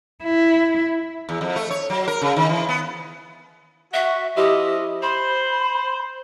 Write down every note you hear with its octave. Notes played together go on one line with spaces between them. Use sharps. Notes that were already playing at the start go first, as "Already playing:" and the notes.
E4
E2
F2
A3
C#5
F#3
A#4
C#3
D#3
E3
B3
F#4 E5
F3 E4 G4 D#5
C5 B5